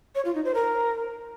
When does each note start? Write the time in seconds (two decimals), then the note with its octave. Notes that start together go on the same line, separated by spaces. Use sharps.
0.15 C#5
0.25 F4
0.35 D#4
0.45 C5
0.54 A#4